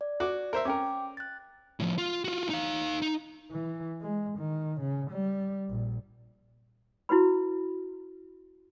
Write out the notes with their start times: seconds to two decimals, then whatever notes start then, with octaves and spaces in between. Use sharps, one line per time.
0.01 D5
0.20 F#4 D6
0.53 A#4 C5 E5
0.65 C#4 A#4 G5 D6
1.17 F#6 A6
1.80 A2 F3
1.98 F4
2.24 F4 F#4
2.49 D#4 F5
3.02 D#4
3.51 E3
4.02 G#3
4.38 D#3
4.80 C#3
5.10 G3
5.69 A#1
7.09 E4 F#4 B4 B5